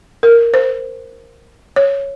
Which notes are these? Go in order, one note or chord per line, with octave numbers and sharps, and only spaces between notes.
A#4
C5
C#5